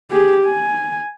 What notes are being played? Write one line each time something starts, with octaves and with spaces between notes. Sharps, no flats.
G4 G#4
G#5